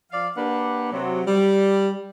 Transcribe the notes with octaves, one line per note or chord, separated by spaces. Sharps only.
F3 D5 F5
A#3 D4 G4 B4 F#5
C3 F#3
G3